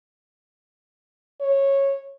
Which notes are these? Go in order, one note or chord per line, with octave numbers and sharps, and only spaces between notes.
C#5